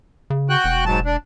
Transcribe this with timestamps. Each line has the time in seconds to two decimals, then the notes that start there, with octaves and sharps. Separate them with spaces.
0.30 C#3
0.50 F#4 G5 F#6
0.64 E1
0.86 G#2 F#3 A5
1.05 D4